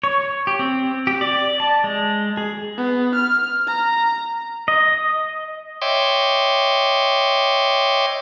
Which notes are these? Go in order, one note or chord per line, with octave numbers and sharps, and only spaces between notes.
C#5
G4
C4
G4
D5
A5
G#3
G#4
B3
F6
A#5
D#5
C#5 D#5 E5 G5 C6 D6